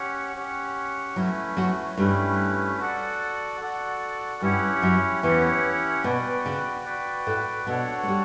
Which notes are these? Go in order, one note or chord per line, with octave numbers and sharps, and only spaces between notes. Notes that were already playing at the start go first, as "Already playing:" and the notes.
Already playing: C#4 G4 C#5 F#5
C#4 G4 C#5 F#5
F#3 A3 C#4 E4 F#4 B4
F#3 F#4
G2 G3 A3 C#4 E4 B4
F#4 A4 D5 F#5
F#4 A4 D5 F#5
G2 G3 C#4 E4 G4 C#5 F#5
F#2 F#3
E2 E3 C#4 E4 G4 C#5 F#5
B2 F#4 B4 D5 G5
C#3
F#4 B4 D5 G5
A2 A3
B2 B3 D4 F#4 A4 C#5 F#5
A3
G3